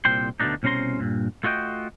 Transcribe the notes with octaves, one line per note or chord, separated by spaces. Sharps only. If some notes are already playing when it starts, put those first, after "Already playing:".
C2 A#2 C5 G5 C6
D2 B2 F3 A3 D4 D#4
C2 B2 C#4 C5 A#5 C6
G2 A#2
A3 F4 F#4 D#5 G5